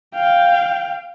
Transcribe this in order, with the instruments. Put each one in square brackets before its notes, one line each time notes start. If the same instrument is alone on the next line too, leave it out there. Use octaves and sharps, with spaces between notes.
[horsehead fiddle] F5 G5